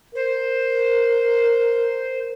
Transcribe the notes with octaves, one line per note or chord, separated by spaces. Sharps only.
A#4 C5